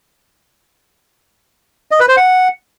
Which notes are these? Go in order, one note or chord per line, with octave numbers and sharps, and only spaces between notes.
D#5
B4
C5
F#5